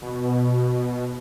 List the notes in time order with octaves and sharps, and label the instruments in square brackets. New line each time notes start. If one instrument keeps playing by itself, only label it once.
[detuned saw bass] B2